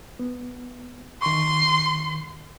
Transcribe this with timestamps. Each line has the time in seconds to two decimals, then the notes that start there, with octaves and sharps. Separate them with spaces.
0.19 B3
1.22 D#3 C6 C#6